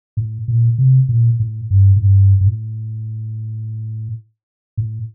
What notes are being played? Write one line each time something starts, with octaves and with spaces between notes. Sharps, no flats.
A2
A#2
C3
A#2
A2
G2
A2
G2
G2
A2
A2